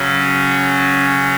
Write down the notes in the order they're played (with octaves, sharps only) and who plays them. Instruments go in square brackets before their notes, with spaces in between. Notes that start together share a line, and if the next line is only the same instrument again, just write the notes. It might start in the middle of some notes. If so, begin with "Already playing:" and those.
Already playing: [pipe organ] C#3 F#3 C#4